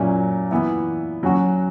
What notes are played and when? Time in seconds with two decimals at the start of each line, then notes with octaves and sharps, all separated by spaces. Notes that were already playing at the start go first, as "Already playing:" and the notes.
Already playing: A#2 F#3 C#4 E4
0.51 E3 B3 E4
1.23 F#3 C#4 F#4